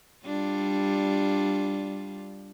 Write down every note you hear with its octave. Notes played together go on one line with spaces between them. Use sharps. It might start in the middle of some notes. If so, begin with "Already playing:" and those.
G3 D4 F4